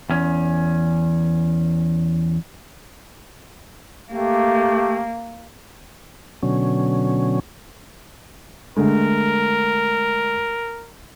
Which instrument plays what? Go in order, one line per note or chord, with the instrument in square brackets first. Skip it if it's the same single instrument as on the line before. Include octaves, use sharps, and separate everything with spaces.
[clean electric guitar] E2 C#4
[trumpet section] A3 G4 [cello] A#3
[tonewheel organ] B2 D3 F#3 C#4
[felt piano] D3 G#3 A3 [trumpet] A#4